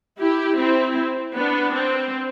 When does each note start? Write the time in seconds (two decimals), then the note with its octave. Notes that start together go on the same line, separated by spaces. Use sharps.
0.18 E4 G4
0.57 C4 E4
1.35 B3 D4
1.73 C4